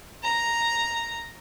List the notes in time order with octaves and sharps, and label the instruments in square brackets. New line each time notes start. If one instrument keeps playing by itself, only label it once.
[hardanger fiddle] A#5